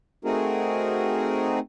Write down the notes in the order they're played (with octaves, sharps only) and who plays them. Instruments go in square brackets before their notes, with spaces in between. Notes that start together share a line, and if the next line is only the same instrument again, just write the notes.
[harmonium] A3 C4 D#4 F#4 G#4 A#4